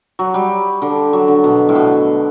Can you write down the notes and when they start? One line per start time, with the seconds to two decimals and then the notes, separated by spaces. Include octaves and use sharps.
0.19 F#3
0.34 G3
0.82 D3
1.13 F#3
1.28 D3
1.44 B2
1.69 A2
1.75 B2